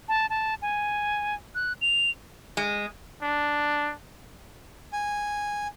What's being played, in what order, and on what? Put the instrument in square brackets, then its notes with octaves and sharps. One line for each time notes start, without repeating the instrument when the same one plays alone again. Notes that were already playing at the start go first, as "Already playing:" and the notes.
[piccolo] A5
A5
G#5
F#6
F7
[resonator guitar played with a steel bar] G#3
[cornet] D4
[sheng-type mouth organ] G#5